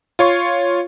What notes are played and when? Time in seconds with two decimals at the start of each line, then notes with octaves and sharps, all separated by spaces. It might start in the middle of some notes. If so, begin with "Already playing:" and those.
0.19 F4 C#5 C6 C#6